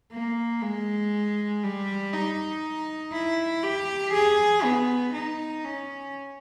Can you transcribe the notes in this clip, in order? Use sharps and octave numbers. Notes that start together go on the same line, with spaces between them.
A#3
G#3
G3
D#4
E4
G4
G#4
B3
D#4
C#4